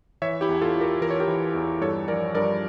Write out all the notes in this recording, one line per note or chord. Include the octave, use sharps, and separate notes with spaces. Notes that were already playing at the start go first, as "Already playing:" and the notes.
E3 C#5 E5
E4 G4
E2
F4 A4
E2
G4 A#4
E3 A#4
C#5
G4 A#4
E3
E2
G2 A4 C#5
F3 A#4 D5
G2 A#4 D5